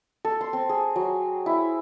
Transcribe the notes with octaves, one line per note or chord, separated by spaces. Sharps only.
A4
C6
C4
G#4
F#3
E4